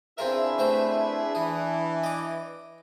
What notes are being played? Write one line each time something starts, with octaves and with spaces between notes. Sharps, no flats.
C4 D4 E4 F4 G#4 A#4 B4 E5
A3 C4 C5
E3 G#4
D#5 D6